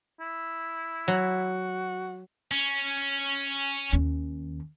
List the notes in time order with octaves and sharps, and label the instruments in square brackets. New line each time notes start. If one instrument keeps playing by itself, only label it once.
[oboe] E4
[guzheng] F#3 [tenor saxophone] F#4
[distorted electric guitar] C#4
[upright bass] D#2 C#4